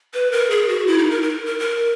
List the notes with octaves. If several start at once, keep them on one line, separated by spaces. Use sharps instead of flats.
B4
A#4
G#4
F#4
E4
D#4
A#4
A#4
A#4
A#4